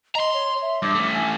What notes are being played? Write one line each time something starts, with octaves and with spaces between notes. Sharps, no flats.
D#5 A#5 C6
C#5
E5
G2 D6
A3 C#4
G#5